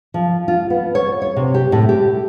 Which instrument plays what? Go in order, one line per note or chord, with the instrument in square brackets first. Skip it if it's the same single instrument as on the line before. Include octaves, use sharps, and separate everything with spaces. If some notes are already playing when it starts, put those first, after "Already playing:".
[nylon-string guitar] F3
F4
B3
C#5
C#5
C3
G4
A2
G4